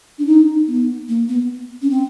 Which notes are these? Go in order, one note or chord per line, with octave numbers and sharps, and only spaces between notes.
D4
D#4
B3
A#3
B3
C#4
C4